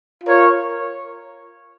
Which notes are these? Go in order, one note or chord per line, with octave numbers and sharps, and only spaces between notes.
F4 A#4 C#5